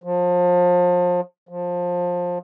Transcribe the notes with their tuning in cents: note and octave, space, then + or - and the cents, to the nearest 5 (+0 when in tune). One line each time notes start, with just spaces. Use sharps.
F3 +30
F3 +20